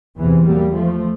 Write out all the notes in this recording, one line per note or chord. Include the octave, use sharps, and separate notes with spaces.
E2 C3 E3
G3 A#3
F3 A3